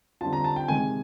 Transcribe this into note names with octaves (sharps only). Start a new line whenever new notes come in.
D3 G3 C4 F4 A5
A#5
A5
G5
C3 D#3 G#3 G#5